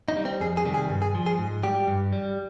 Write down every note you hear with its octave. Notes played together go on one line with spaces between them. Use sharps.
D#4
G3
C4
F2 G#4
G#4
C3 D#3 G3
G#4
G2
G#4
F3
G#4
G#2
G3 G4
G2
G3